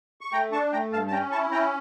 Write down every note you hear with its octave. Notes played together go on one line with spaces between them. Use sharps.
C#6
A3 G5 A#5
D4 A5 C#6
A3 G5 A#5
G2 F5 A5
A5
C#4 G5 A#5
E4 A5 C#6
C#4 G5 A#5